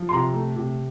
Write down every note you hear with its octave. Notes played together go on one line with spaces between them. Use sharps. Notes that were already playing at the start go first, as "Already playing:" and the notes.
Already playing: F3
C6
C3 A#5
A3
C3